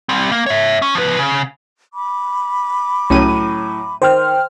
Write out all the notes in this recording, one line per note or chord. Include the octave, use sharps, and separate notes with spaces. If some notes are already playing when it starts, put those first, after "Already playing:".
G3 C4
A#3
C#5 E5
C#4
F3 B4
C#3
B5 D6
C2 A2 F#3 C#4 D#7
D#3 C5 G5 F6